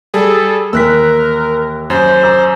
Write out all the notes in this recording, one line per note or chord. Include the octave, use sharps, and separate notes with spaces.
G3 G#4 A4
D#2 E3 A#4 E6 F#6 B6
F#2 C5
A#5 D6 E6